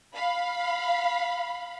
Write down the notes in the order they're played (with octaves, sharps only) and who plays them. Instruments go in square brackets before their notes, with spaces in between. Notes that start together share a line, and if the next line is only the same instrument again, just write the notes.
[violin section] F5 B5